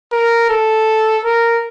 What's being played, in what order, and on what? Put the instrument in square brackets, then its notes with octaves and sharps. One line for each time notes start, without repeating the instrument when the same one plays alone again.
[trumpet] A#4
A4
A#4